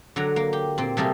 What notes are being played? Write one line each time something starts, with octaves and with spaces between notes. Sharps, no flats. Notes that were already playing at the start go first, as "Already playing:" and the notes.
D3 F#3 A#5
A#3
G4
A#2 C4
C3 G3 A3 A#3 G#4 A4